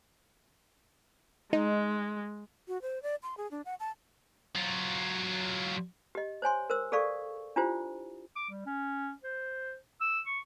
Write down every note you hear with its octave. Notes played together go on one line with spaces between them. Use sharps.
G#3 D#4
F#4
C5
D5
C6
G#4
D4
F#5
A5
F#3 F4
G4 D#5
C5 C#5 G#5 C6
A#4 C5 E6
G#4 A4 D5 F5 C#6
D4 E4 F4 G4 C5
D6
G3
C#4
C5
E6
C#6